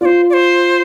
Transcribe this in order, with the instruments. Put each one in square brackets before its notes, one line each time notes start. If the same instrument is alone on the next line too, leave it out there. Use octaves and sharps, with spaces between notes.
[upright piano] F4 [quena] D5
[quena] C5
D5
C5